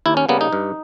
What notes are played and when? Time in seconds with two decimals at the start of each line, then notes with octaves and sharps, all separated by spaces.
0.06 D#2 E4
0.17 C#4
0.29 C#3 G3 A#3 B3
0.41 D#4
0.53 G2